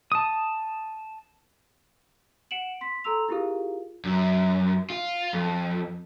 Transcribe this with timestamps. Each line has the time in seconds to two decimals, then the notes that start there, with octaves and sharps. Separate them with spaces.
0.12 A5 D#6
2.51 F#5 C#7 D7 E7 F#7
2.81 C6 B6
3.04 A4 A#5 C6 E6 F7
3.29 E4 F4 G4 G#4 A#4 F5
4.05 F#2
4.90 F4
5.33 F2